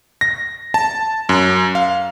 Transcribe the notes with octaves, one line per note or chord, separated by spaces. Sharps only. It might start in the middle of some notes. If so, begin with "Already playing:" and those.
A#6
A5
F#2
F5